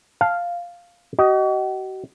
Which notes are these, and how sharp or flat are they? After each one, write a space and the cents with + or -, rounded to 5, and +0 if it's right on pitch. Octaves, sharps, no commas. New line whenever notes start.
F5 +0 A5 +0
F#4 +45 D#5 +0